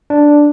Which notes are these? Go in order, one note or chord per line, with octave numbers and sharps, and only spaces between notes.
D4